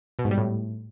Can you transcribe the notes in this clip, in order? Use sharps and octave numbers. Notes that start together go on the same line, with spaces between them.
B2
G#2
G3
A2